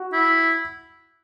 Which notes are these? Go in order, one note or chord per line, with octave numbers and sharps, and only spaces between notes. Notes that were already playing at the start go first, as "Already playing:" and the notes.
Already playing: F#4
E4